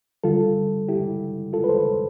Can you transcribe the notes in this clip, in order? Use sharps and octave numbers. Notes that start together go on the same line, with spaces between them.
D3 G3 F4 A4
E4 G4
F4 A4
B4
A4 C5